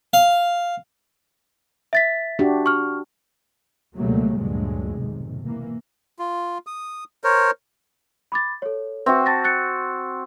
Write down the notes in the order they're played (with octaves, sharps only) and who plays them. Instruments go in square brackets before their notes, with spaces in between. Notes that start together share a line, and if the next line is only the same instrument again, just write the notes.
[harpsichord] F5
[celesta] E5 A6 B6
[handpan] D4 F#4 G4
[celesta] C#6 F6
[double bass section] C#2 B2 F#3 G3 A3 A#3
D2 G2 A#2 D3 F#3 G#3
F1 B1 G#2 C3 D#3
E3 A#3
[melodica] F4
D#6
A#4 C5 C#5
[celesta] B5 D6 A6
A4 C#5
[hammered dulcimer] C4 F#4 [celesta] B4 E5
[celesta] A5 A6 A#6
F#6 A6 C#7